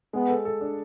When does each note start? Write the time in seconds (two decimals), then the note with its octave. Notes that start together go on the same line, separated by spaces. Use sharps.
0.13 G#3 B3
0.29 A4
0.45 A4
0.61 D4